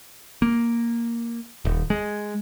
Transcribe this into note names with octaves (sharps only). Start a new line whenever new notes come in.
A#3
D#1
G#3